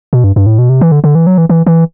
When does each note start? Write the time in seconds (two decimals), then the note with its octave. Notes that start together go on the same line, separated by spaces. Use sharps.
0.13 B2
0.24 G2
0.36 G2
0.46 A2
0.59 B2
0.69 C3
0.81 E3
0.92 D3
1.04 D3
1.15 E3
1.27 F#3
1.38 E3
1.49 E3
1.66 E3